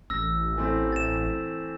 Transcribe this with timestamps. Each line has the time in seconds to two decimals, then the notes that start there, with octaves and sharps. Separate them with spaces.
0.10 A1 E6 A#6
0.57 E3 A3 C4
0.92 A6 E7